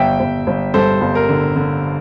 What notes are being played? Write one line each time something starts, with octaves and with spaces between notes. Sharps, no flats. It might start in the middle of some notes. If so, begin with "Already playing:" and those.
Already playing: G1 E5 G5
G1
G1
G2 A4 C5
G1
A#4
D3
D3